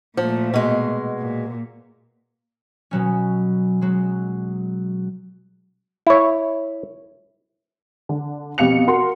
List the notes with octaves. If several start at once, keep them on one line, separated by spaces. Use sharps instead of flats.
A#2 F3 A3
B2 G#3
A#2
B2 F#3 C#4
F#3 G#3
E4 C#5
D3
F2 B2 G4 F5 C#7 F7
F#4 A#4 C6